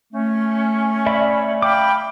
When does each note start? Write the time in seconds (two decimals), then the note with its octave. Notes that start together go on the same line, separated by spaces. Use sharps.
0.13 A3 C#4
1.06 D5 E5 B5
1.62 E5 F5 G5 B5 D6